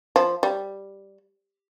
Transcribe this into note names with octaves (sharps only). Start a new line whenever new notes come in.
F3
G3